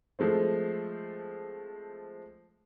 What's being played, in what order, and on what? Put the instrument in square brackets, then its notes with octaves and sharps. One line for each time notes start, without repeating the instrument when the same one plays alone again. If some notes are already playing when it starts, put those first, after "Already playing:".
[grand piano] F3 G#3 A3 C4